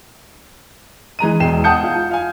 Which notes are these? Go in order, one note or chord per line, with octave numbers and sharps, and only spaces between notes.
E3 G#3 A#5 D#7
E1 G#3 G5 C7 E7
F#5 G5 A5 D#6 G6 C#7
F4
F5 G#5